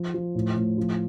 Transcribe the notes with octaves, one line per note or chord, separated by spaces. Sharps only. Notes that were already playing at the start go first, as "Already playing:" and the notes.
Already playing: F3
F3
A2
A2
F3